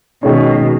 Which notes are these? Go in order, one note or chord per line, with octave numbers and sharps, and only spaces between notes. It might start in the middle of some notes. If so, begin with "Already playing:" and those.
B2 D#3 G#3 C#4